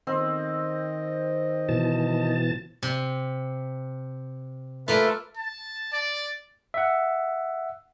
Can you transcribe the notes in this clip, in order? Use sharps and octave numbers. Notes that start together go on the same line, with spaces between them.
D#3 C4 D#5
B2 E3 A5
C3
A3 A#3 F4 A4 B4 E5
A5
D5
E5 F#5